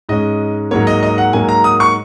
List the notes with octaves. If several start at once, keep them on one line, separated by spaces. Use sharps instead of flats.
G#2 G#3 C#4 D#5
G#2 F#3 A#3 C#5
D#5
D#5
F#5
G#2 F#3 A#3 G#5
A#5
D#6
C#6